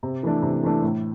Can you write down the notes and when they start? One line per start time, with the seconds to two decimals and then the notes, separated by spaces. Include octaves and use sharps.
0.03 C3
0.23 E3 A3 D4
0.42 C3
0.63 E3 A3 D4
0.82 A2